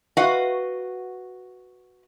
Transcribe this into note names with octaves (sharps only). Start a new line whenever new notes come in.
F#4 B4 D#5 F5 F#5